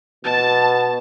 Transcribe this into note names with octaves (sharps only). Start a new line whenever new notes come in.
B2 A5 A6